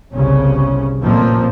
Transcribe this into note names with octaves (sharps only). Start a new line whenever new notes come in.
G1 C2 C#3 C#4
A1 F2 A#2 F3 A#3 C4